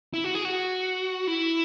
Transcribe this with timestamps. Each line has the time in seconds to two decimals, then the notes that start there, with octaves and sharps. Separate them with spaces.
0.14 E4
0.24 F#4
0.34 G#4
0.45 F#4
1.27 E4